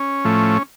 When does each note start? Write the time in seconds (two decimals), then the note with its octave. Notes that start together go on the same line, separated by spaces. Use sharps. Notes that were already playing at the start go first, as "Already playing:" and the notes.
Already playing: C#4
0.24 A2 F3 A3